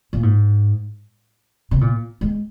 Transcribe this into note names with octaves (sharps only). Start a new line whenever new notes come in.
A#2
G#2
C3
A#2
G#3